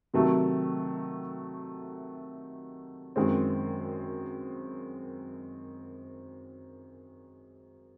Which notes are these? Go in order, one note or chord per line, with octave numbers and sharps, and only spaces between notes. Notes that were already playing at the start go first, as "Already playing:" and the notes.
C3 D#3 F#3 A3
F#2 D#3 G#3 C4